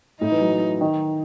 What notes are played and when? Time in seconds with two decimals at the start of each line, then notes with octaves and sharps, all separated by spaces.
0.21 A2 D#4
0.31 E3
0.40 F#3
0.81 D#3